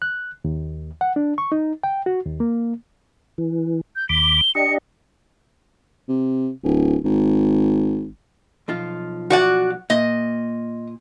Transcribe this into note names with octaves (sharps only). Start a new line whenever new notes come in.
F#6
D#2
F#5
D4
C#6
D#4
G5
F#4
D#2
A#3
E3
G6
D#2 B5 D6 G7
D4 G4 D#5 C#7
C3
D1
G#1
B1 F3 F4
F#4 D5 F#5
A#2 D#5